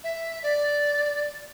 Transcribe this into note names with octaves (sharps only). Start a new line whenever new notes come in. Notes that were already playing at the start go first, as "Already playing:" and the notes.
E5
D5